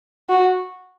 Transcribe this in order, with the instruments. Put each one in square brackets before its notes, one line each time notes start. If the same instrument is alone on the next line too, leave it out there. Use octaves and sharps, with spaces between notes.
[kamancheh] F#4